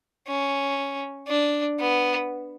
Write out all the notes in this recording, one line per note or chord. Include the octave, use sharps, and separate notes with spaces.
C#4
D4
B3